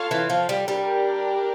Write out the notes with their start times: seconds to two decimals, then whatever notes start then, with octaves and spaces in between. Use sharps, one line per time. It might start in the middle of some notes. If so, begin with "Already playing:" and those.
Already playing: F4 A4 C#5 F5 A5
0.11 E3
0.30 F3
0.49 G3
0.68 G3 D4 G4 A#4